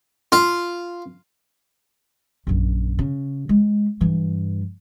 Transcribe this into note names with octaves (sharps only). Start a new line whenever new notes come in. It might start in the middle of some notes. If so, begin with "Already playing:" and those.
F4
A#1 F#2
C#3
G#3
G2 E3